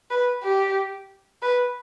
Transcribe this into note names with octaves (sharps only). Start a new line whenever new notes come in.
B4
G4
B4